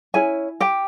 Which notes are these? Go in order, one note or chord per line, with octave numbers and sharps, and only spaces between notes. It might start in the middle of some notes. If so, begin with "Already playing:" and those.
C#4 E4 G#4 G#5
G4 G5